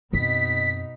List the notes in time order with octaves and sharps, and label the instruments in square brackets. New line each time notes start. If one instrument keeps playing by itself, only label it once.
[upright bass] F#2 C4 [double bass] B2 D#4 [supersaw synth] B6